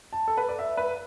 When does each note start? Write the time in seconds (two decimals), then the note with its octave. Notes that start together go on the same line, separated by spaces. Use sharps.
0.13 A5
0.28 A4
0.37 B4
0.49 D5
0.59 E5
0.77 B4